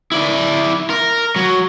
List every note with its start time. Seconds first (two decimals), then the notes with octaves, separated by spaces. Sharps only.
0.12 E4 D5
0.90 A#4
1.36 F#3